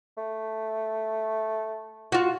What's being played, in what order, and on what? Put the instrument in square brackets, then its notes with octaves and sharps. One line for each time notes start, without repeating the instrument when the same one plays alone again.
[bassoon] A3
[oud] F4 F#4